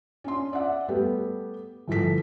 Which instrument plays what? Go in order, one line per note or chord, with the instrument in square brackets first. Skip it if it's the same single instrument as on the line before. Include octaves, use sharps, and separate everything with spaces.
[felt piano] C#4 D4 C6
D5 E5 F#5
G3 A3 B3 G4
G1 A2 F3 A4 B6